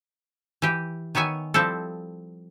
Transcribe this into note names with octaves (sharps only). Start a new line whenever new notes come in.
E3 G4
D#3 B3 C#5 E5 G#5
F3 G3 C4 E4 A4